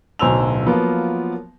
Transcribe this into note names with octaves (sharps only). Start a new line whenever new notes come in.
D1 B1 C5 G#5 E6 F7
F3 F#3 A#3 B3 F4 A#4